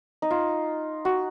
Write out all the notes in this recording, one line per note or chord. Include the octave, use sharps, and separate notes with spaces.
D#4
F4
F#4